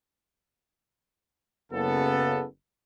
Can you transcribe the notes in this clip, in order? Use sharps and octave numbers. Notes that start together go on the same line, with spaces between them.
F#1 C#3 B3 A4